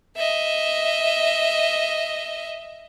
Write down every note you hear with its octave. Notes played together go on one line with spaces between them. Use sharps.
D#5 E5